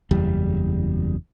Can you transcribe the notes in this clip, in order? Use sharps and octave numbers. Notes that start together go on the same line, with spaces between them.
F#1 E2 G3